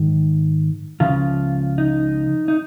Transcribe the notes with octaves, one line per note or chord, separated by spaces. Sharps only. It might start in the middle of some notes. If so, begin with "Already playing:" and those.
Already playing: G#2 D#3
C#2 C#3 F3 F4
D#4
D#4